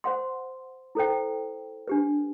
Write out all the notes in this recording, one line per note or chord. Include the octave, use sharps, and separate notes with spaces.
C5 F#5 C6
E4 A4 C5 G5
D4 G4 B4